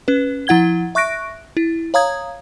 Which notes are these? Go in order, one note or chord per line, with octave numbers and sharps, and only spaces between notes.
C#4 B4
F3 E4 F#5 G#6 G7
E5 C#6 F#6 A#6 D7
E4
C#5 F5 A#5 D#6 G#6